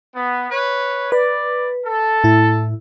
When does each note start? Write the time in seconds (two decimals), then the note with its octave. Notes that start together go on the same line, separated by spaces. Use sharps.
0.15 B3
0.50 B4 C#5
1.12 B4 D5
1.84 A4
2.24 A2 E4